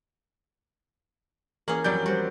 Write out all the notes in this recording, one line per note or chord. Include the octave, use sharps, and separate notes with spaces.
E3 A#3 C#4 G#4 F#7
F2 F#3 G3 D5 G6
G3 F#4 G4 C5